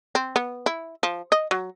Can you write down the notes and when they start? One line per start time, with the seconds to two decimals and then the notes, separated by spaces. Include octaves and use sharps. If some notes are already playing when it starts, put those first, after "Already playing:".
0.15 C4
0.36 B3
0.66 E4
1.03 F3
1.32 D#5
1.51 F#3